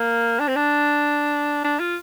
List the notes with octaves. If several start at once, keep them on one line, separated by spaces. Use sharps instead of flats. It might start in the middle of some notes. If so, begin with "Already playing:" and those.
Already playing: A#3
D4
C4
D4
D4
F4